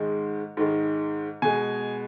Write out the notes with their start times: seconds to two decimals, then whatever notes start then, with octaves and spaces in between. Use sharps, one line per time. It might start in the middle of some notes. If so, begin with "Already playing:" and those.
Already playing: G#2 D#3 G#3
0.57 G#2 D#3 G#3
1.42 B2 G#3 G#5